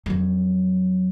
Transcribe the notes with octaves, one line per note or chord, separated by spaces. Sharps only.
F2 F#3